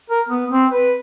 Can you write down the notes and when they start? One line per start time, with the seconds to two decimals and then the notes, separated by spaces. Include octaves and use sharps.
0.10 A#4
0.29 B3
0.51 C4
0.71 B4